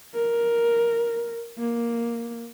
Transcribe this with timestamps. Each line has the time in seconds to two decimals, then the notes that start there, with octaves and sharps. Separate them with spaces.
0.14 A#4
1.58 A#3